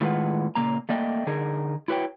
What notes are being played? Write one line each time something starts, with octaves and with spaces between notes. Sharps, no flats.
A2 D#3 G#3 F4 B4 F#5
A#2 C#3 A#3 A#5
A3 A#3 D5 D#5 G5
D3 D#4 G#4 A#4
E4 F#4 B4 C#5 G5